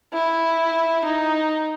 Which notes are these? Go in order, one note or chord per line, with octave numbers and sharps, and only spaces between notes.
E4
D#4